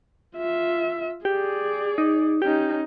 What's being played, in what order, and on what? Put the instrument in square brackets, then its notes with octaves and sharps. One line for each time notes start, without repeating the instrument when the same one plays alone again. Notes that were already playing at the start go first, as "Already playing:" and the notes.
[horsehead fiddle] F4 E5
[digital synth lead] G4 [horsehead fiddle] G#4 D5
[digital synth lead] D#4
[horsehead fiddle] C#4 D#4 [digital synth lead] G4